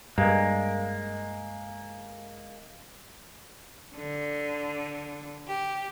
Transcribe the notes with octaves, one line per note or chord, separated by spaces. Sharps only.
G2 G#3 A#3
D3
G4